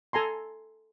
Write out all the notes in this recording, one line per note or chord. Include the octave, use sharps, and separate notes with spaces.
A4 G#5 A#5 C6